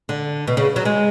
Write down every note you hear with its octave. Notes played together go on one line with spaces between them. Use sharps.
D3
B2
C#3
F#3
G#3